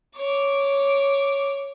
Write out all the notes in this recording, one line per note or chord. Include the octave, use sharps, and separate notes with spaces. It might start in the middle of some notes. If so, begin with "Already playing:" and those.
C#5 D6